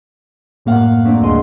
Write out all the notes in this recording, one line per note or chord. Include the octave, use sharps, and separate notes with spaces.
F#2 A2 A#3 F5 F#5
F#3 A3 A#3 C4 D4
D2 G2 C#3 G#3 D#5 C6